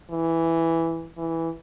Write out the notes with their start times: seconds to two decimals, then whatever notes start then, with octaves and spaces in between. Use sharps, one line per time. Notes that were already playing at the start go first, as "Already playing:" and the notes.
0.10 E3
1.17 E3